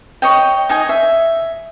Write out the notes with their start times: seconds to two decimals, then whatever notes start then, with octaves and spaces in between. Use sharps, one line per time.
0.22 C#5 D#5 G5
0.69 D#4 D#5 G#5
0.89 E5